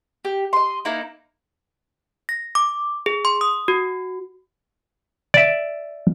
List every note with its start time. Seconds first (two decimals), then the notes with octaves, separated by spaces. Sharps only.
0.25 G4
0.53 D#5 C6
0.85 A#3 D#4 E4
2.29 A#6
2.55 D6
3.06 G#4
3.25 C6
3.41 D#6
3.68 F#4
5.34 D5 E5